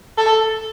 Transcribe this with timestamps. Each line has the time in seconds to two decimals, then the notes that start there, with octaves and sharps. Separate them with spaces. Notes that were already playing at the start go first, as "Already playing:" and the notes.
0.18 A4